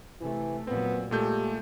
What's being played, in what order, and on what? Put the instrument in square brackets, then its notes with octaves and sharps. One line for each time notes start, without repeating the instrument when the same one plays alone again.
[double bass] C3 A3 [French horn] E3
[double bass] A#2 F#3 [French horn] B3 [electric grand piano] C4
[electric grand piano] A#2 A3 G6 [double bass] G#3 [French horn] G4